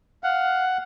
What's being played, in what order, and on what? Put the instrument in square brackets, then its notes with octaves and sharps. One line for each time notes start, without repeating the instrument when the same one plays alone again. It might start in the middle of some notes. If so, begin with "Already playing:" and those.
[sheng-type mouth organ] F5 [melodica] F#5